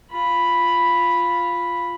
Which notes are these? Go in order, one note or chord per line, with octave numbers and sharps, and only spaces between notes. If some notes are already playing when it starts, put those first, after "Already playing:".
F4 B5